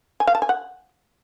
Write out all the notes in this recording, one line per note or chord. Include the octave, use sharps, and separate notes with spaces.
G#5
F5
A5
G#5
F#5